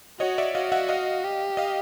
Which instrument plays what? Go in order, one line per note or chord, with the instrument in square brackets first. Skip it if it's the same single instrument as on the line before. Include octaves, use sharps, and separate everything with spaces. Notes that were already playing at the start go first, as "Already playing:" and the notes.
[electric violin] F#4 [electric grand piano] C#5 D#5
[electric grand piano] D5 E5
[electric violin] F#4 [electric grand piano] D#5 F5
[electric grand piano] E5 F#5
D#5 F5
[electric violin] G4
[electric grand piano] D#5 F5